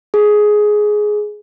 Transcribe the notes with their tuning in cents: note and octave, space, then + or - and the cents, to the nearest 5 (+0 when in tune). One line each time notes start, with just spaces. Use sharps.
G#4 +10